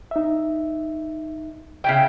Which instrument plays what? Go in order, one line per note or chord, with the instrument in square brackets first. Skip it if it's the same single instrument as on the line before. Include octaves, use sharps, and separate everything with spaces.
[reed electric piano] D#4 E5
[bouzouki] C#3 E4 G5